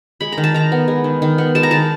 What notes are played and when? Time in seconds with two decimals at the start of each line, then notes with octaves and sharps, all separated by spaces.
0.21 G#3 B5
0.32 A#5
0.38 D#3
0.44 A5
0.54 D#3 A#5
0.72 B3
0.88 G#3
1.04 D#3
1.22 D#3
1.38 B3
1.55 G#3 A5
1.63 A#5
1.71 D#3 A5